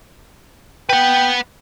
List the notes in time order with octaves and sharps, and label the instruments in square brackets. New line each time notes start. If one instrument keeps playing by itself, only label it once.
[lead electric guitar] B4 F#5 [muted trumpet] G5